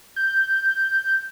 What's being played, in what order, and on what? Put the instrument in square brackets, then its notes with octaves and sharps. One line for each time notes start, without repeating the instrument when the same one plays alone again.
[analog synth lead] G6